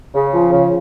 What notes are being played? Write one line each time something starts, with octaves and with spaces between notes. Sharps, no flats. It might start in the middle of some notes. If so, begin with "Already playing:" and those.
C#3
F3
C#3